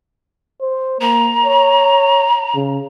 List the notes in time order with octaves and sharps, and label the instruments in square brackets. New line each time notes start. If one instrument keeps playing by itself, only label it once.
[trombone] C5
[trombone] A#3 [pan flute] A#5
[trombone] C#5
C#3